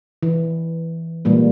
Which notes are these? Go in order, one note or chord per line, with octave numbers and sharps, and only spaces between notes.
E3
A#2 D#3 E3 G3 G#3 A#3